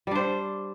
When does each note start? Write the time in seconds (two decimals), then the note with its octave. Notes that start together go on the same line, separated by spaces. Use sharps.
0.07 G3
0.11 D4
0.15 C5